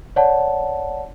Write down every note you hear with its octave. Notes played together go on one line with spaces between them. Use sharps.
C#5 D5 F#5 A5